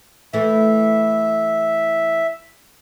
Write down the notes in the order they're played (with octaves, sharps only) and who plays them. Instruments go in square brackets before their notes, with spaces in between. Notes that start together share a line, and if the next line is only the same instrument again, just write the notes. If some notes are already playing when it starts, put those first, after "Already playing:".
[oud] E3 A3 [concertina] E5